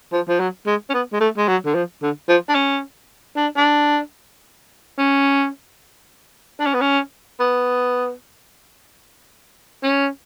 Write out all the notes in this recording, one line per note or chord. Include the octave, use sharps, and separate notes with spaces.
F3
F3
F#3
G#3
C#4
B3
G#3
A3
G#3
F#3
D3
F3
D3
F3
D4
C#4
D4
D4
C#4
D4
C#4
B3
C#4
B3
C#4